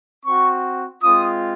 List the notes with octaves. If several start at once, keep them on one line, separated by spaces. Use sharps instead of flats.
C4 F#4 C#6
G#3 C4 F4 D#6